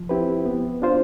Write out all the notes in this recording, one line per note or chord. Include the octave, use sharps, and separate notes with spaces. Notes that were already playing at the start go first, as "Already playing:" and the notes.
Already playing: F3
C4 E4 G4 B4
B3
D4 F4 C5